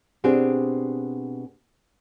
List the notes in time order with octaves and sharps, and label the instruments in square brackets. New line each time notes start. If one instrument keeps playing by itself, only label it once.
[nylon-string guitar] B2 C4 D4 G4 G#4